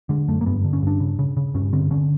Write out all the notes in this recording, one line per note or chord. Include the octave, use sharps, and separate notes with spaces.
D3 G#3
F#2 A3
A#3
G2 B3
D3
C#4
G2 D4
C#3
C#3
C#3
G2 C#4
D3 C4
D3 C#4